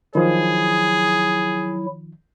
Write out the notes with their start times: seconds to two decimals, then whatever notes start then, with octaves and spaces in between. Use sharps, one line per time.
0.15 D#3 F3 F#3 E4 G#4